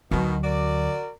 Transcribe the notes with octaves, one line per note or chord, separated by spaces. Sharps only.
D2 B2 D#3 F#3
F#4 A#4 D5